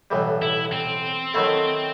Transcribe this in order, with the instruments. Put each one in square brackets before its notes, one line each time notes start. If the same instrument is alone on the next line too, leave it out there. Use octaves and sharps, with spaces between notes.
[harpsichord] B1 A2 E3 G3
[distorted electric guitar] E4
C4
[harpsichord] D#3 F#3 A3 E4 A4